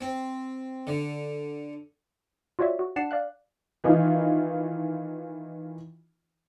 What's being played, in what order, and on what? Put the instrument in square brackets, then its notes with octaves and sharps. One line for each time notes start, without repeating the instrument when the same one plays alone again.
[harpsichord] C4
D3
[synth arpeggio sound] F4 F#4 C#5 D5 E5
F#4
D4 D5 F#5 A5 C7 E7
D5 F5 F#6
[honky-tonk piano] D#3 E3 D#4 F4